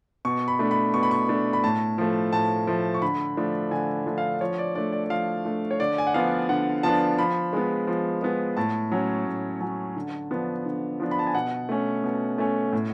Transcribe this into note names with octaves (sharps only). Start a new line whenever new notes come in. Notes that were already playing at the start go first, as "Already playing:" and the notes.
B2 C#6
B5
A3 D4
B5
B2 C#6
B5
C#6
A3 D4
B5
A2 A5
F3 A3
A2 A5
F3 A3
C#6
D3 B5
F3 A3 D4
D3 G#5
F3 A3 D4
F5
F3 C#5
D5
A3 D4 D5
D5
D5
F3 F5
A3 D4
C#5
D3 D5
G#5
F#5
F3 B3 D4 F5
D3 F#5
F3 B3 D4 A5
F3 B5
G#3 B3
F3
G#3 B3
A2 A5
F#3 C#4
A2
F#3 C#4
D3
F3 B3 D4
D3
F3 B3 D4
B5
A5
G#5
B2 F#5
A3 C#4
B2
A3 C#4
A2